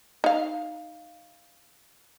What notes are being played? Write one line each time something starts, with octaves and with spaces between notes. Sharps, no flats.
D#4 F5